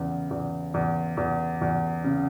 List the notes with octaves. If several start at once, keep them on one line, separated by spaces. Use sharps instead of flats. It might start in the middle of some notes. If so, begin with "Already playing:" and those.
Already playing: E2 C#3
E2
E2
E2
E2
C#3